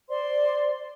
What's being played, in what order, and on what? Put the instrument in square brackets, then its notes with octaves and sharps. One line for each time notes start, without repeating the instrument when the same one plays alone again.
[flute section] C5 D5 C6